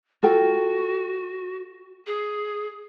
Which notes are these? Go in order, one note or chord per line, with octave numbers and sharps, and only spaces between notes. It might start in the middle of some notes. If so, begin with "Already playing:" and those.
F4 F#4 A4 G5
G#4